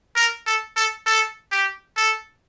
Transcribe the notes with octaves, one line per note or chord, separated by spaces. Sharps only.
A#4
A4
A4
A4
G4
A4